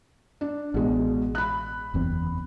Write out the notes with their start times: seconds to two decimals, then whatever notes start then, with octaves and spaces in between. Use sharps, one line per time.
0.41 D4
0.74 A1 B2 G#3
1.35 B5 F#6
1.94 F#1 E2 C4